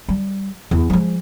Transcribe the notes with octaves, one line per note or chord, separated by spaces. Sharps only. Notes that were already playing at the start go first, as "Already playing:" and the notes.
G3
E2
F3 G#3